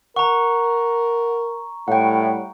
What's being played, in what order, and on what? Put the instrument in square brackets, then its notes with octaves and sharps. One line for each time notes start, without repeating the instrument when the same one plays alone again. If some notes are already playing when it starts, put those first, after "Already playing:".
[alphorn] A#4 [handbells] F#5 [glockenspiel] A#5 C#6
[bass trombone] A2 [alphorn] G3 [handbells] F#5 G5